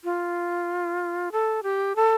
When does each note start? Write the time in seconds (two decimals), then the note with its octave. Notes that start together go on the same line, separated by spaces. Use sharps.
0.04 F4
1.32 A4
1.63 G4
1.96 A4